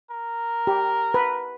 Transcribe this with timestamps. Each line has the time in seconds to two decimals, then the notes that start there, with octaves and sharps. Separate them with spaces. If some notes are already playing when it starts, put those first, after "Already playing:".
0.10 A#4
0.67 G4
1.14 B4